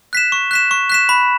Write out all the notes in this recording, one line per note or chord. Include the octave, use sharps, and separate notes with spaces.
F#6 B6 E7
C#6
F#6 B6 E7
C#6
F#6 B6 E7
B5